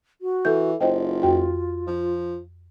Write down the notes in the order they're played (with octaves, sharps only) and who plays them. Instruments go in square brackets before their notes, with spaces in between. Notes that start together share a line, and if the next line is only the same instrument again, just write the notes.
[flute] F#4
[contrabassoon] E3 [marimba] A4 G6
[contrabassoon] F#1 [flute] F4 [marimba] C5 D#5 G5
[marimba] F2 F#4 G5
[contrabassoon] F3